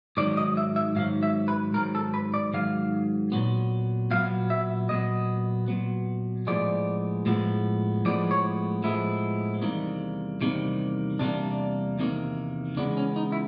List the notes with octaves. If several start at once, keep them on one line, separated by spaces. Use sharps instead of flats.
G#2 D#3 F#3 D5
D#5
E5
E5
G#2 D#3 F#3 F5
E5
B4
G#2 D#3 F#3 A#4
A4
B4
D5
G#2 D#3 F#3 F5
A#2 F#3 B3
A#2 F#3 B3 F5
E5
A#2 F#3 B3 D#5
A#2 F#3 B3
A2 F3 G#3 B3 D5
A2 F3 G#3 B3
A2 F3 G#3 B3 D5
C#5
A2 F3 G#3 B3 E4
E2 C3 D#3 G3 A#3
E2 C3 D#3 G3 A#3
E2 C3 D#3 G3 A#3 D4
E2 C3 D#3 G3 A#3
C#3 E3 G#3 B3 D4
C#4
D#4
E4